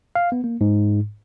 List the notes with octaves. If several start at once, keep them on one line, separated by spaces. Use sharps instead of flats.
F5
B3
A#3
G#2